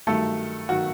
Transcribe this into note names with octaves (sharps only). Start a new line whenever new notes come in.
G2 D#3 F#3 A3 A4
D#3 F#3 F#4